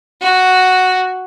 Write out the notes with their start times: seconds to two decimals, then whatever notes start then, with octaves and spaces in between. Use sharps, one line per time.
0.21 F#4